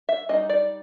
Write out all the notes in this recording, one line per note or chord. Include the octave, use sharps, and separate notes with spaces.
E5
G3 C4 D#4 D#5
D5